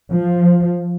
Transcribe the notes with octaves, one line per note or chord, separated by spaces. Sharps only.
F3